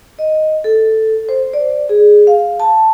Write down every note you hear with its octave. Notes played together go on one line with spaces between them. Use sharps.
D#5
A4
C5
D5
G#4
F5
A5